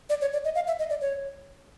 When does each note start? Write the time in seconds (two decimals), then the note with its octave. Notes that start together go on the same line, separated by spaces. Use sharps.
0.10 D5
0.21 C#5
0.33 D5
0.45 D#5
0.55 F5
0.67 E5
0.79 D#5
0.90 D5
1.01 C#5